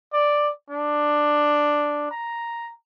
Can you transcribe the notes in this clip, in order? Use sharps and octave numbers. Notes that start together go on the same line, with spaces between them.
D5
D4
A#5